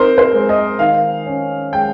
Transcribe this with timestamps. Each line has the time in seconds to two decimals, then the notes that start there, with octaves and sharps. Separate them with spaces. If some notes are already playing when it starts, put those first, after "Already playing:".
Already playing: C4 D#4 A#4 C5
0.18 C5
0.33 G#3
0.49 D#5
0.79 D#3 F5
1.26 C#4
1.73 G#3 G5